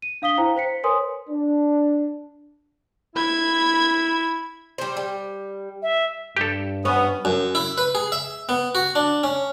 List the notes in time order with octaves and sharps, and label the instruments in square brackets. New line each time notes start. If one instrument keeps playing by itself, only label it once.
[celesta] D#7
D4 F5 D#6 B6 G7
E4 C5 F5 G5 A#5
C5 B6 C#7
A#4 B4 C#5 G#5 C6 D#6
[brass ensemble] D4
[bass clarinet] E4 [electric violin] B5 G#6
[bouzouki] G3 C5
G3
[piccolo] E5
[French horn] G2 [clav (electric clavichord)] G4 A4
[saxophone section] B3 [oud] C#4
[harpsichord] F#2
E4
B4
G#4
E5
B3
F#4
D4
C#4